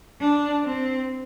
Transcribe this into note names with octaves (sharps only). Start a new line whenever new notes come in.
D4
C4